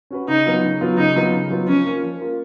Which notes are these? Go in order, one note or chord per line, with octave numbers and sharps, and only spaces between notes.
C#4 F#4 B4
C#3 D#4
F#3 B3 F4
C#3
F#3 B3 F4
C#3 D#4
F#3 B3 F4
C#3
F#3 B3 F4
F3 C#4
A#3 F4 A#4
F3
A#3 F4 A#4